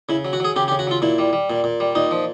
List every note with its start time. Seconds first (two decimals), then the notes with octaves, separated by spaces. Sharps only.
0.09 C#3 E4
0.25 F#3
0.33 F#4
0.40 F#3 G#4
0.56 C#3 G4
0.68 G4
0.72 C#3
0.79 F#4
0.87 F#3 F4
1.02 A#2 E4
1.19 G3
1.33 G3
1.50 A#2
1.64 A#2
1.80 G3
1.95 A#2 D#4
2.11 F3